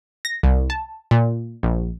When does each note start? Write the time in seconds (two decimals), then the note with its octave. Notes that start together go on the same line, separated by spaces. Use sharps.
0.25 A#6
0.43 C2
0.70 A5
1.11 A#2
1.63 A#1